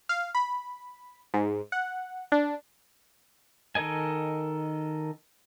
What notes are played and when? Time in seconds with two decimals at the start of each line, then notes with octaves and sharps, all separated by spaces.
0.09 F5
0.35 B5
1.34 G#2
1.72 F#5
2.32 D4
3.75 D#3 A4 A#4 D#5 G#5